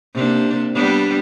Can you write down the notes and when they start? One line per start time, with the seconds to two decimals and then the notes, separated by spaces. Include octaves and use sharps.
0.14 C3 A#3 D4
0.74 G3 B3 D4